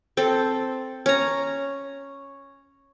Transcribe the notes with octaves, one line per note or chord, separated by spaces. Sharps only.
C4 A4
C#4 A#5